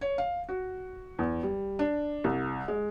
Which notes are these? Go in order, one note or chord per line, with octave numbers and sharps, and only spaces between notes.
C#5
F5
F#4
E2
G3
D4
C2
G#3